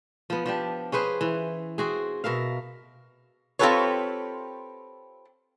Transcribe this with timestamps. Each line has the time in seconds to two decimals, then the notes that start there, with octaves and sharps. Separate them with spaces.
0.30 F3 B3
0.46 F3 D4 G4
0.92 C#4 G#4 B4 C5
1.21 E3
1.78 C4 F#4 G#4
2.24 B2 A#4 E5 F5
3.59 C4 F4 G4 A4 B4 C#5